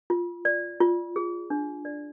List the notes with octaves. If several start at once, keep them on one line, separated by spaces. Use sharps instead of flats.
F4
D5
F4
G#4
D4
D5